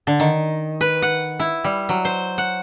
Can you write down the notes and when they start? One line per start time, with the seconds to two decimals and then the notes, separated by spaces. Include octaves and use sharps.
0.07 D3
0.20 D#3
0.81 B4
1.02 F#5
1.40 E4
1.64 G3
1.89 F#3
2.05 C5
2.38 F#5